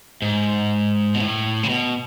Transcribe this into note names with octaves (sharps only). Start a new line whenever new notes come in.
G#2
B2
A2
C#3
B2